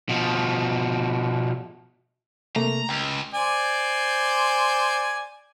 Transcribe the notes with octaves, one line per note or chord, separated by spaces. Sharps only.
B2 F3
C3 A3 A#3 A#5
C#2 G5
C5 D5 G#5